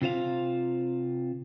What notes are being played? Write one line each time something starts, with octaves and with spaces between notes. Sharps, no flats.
C3 F4 C5 F5